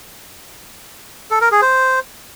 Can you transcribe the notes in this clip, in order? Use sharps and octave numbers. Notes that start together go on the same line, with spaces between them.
A4
A#4
G#4
C5